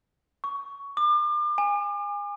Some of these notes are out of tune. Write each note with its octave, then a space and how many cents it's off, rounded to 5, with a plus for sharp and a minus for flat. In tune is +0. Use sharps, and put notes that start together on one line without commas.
C#6 +15
D6 +40
G#5 -25